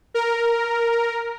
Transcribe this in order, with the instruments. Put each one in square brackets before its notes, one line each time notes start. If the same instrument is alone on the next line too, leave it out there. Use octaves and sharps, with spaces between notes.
[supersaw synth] A#4